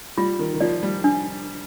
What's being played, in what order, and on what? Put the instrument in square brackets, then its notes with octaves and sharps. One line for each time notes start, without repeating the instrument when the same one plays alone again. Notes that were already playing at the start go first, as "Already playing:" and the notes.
[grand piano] G3 [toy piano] F4
[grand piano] D#3
D#3
[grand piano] F3 [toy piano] D5
[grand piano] G3
[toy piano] D4